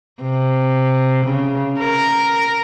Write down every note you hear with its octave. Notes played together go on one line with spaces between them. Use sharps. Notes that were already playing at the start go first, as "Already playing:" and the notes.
C3
C#3
A#4